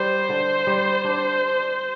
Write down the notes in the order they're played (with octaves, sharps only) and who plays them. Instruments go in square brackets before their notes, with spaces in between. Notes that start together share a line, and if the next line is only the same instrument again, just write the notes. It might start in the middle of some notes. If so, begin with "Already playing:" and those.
Already playing: [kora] G3 [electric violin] C5
[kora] D3
G3
D4